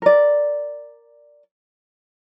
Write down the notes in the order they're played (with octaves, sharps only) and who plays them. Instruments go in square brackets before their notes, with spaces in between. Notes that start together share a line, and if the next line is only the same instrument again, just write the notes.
[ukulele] A#4 D5